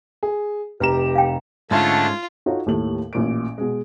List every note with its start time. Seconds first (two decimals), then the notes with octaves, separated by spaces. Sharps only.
0.23 G#4
0.80 F1 G4 B4 A#5 E7
1.15 F5 G5
1.71 G#2 D3 G#3 A3 C#4 D4 F4 A5
2.46 D#4 F4 F#4 A4 C#5
2.66 D#2 A2 A#3 G4 A4 F#7
3.13 A1 A#2 D7
3.58 B2 G#3